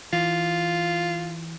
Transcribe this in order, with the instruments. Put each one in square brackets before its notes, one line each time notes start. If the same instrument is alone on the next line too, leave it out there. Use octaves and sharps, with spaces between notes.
[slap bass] E3 [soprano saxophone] F4